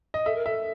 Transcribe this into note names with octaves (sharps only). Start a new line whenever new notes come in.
D#5
A4 E5
A#4
A4 E5